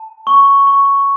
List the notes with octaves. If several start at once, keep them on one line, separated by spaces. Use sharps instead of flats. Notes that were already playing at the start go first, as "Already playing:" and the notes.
Already playing: A5
C#6
C#6